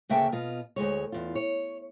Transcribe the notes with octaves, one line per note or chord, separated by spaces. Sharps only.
D2 C#3 A#3 E5 G5 A5
B2 F4 D#5
D2 G#2 G#3 C#5
E2 F4
C#5